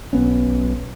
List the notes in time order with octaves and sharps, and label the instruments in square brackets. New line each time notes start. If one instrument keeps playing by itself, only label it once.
[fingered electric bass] B1 B3 C#4